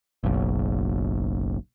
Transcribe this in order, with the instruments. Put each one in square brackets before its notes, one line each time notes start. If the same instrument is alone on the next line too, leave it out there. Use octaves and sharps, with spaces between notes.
[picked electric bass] F#1 B1